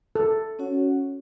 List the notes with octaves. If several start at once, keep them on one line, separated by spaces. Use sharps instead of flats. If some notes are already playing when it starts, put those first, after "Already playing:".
A4
C#4 F#4 C#5 F#5